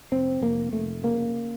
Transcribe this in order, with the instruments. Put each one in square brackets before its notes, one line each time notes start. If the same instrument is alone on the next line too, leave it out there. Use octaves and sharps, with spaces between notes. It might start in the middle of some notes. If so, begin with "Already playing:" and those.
[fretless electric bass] F1 C4
F1 A#3
F1 A3
C#3 A#3